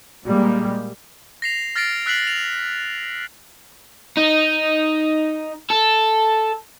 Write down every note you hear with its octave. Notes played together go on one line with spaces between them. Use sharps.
A#2 G3 G#3 A#3
A#6 C7 F7
F6 A6 A#6 C7 D7
E6 F#6 B6 C7 F#7
F7
D#4
A4